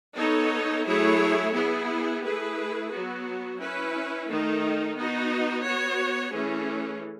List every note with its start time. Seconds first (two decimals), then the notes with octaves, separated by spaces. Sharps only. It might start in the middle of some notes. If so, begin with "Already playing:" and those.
0.18 B3 D#4 A4 C#5
0.87 F#3 A3 E4 G#4 C#5
1.54 B3 E4 G#4
2.23 A3 E4 G#4 B4
2.92 F#3 B3 F#4
3.60 C#4 E4 B4
4.29 D#3 A3 D#4
4.97 B3 D#4 F#4
5.65 B3 F#4 C#5
6.33 E3 A3 C#4 G#4